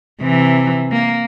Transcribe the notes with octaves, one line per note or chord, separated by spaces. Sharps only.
C3 E3
A#3